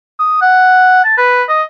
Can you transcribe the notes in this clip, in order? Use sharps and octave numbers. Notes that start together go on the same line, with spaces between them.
D#6
F#5
A5
B4
D#5